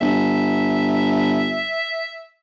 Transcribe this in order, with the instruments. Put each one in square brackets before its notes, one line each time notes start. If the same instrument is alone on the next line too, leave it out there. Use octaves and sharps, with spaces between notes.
[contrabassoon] G1 [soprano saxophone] E5